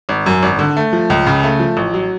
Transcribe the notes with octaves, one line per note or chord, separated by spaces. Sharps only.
G#1
F#2
G#1
D3
A3
F3
C#2
C#3
A3
F3
A1
F#3